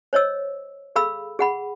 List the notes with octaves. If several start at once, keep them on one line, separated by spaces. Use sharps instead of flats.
C5 C#5 D#5 E6
G#4 A4 F5 B5 E6
G#4 F#5 B5